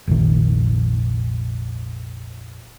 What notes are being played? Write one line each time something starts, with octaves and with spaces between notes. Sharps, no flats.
F1 A#1 D#3